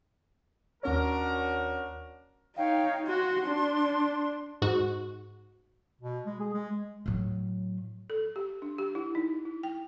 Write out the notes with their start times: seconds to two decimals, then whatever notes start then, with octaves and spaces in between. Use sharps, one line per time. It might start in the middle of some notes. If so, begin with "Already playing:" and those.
0.83 D#2 C#4 D4 F#4 A#4 C#5
2.57 D#4 C#5 F5 G5
3.07 F#4 C6
3.47 D4
4.62 G#2 F#4
6.01 B2
6.26 G#3
6.40 G#4
6.53 G#3
7.06 A2 F#3
8.10 A4
8.36 G4
8.62 D4
8.78 G4
8.95 E4
9.15 D#4
9.45 E4
9.63 G5